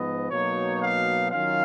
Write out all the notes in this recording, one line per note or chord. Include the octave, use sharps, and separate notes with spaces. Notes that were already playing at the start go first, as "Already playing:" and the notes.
Already playing: G#2 F3 B3 D#5
B2 F#3 A#3 D#4 C#5
F5
D#3 F#3 C#4 F4 F5